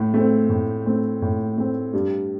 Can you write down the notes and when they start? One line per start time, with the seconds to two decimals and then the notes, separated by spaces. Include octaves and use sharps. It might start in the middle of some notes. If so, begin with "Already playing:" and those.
Already playing: A2 A3
0.14 A3 C4
0.49 A2
0.85 A3 C4
1.22 A2
1.58 A3 C4
1.93 G2